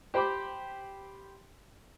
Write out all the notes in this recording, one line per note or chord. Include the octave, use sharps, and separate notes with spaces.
G4 C5 G5 B5 D6